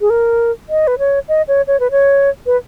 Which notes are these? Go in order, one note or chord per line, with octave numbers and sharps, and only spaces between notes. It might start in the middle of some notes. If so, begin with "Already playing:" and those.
G#4
A#4
D#5
B4
C#5
D#5
C#5
C#5
B4
C#5
B4